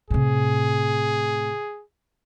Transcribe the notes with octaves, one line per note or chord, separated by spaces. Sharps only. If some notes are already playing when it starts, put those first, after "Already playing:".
A2 C3 G#4